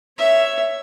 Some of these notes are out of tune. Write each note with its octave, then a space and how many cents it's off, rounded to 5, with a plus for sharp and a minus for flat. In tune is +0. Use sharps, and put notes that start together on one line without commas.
C#5 +0 E5 +5